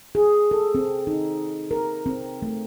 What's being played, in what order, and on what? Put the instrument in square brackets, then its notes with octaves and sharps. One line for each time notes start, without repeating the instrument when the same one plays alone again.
[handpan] G#4
A4
C4
D#4
A#4
C4
A3